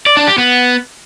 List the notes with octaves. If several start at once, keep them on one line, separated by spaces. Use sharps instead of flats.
D5
D4
G4
B3